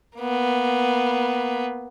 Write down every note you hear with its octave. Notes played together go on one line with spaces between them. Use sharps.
A#3 B3